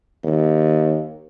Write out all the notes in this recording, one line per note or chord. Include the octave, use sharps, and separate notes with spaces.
D#2